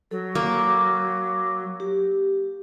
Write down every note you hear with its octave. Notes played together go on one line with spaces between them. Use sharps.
F#3 A4
A#3 D6
G4